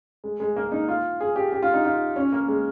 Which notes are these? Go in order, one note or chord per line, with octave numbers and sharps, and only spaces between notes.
G#3
G#3
A#3
D#4
F4
G#4
G4
G4
F4
D#4
F4
C#4
A#3
G#3